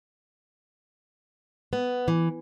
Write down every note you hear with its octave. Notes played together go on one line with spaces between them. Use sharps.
B3
E3